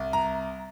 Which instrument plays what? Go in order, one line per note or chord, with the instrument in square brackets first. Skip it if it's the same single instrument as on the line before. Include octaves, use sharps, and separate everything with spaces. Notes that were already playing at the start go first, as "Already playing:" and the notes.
Already playing: [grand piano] C2
A#5